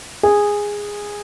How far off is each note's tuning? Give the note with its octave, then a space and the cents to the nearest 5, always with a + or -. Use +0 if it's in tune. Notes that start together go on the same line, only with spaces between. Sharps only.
G#4 -10